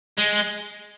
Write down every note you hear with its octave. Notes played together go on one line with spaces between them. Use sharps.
G#3